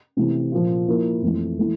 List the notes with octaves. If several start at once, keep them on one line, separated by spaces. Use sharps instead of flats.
C3 E3 A3 C4 E4
A#2 F3 A#3 F4
F3 A#3 E4 A#4
F2 E3 A3
E3 A3 E4 A4